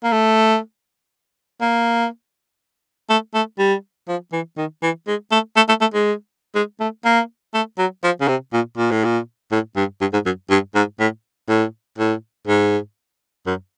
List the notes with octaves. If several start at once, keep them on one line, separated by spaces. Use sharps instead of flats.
A#3
A3
A#3
A3
A3
G3
F3
E3
D#3
E3
G#3
A3
A3
A3
A3
G#3
G#3
A3
A#3
A3
F#3
F3
C#3
C3
A#2
A#2
A2
A#2
A2
G2
G2
G#2
F#2
G2
G#2
A2
A2
A2
G#2
F#2